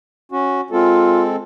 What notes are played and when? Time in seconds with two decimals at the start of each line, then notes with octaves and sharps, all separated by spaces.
0.32 C#4 F#4
0.71 G#3 C4 F4 A4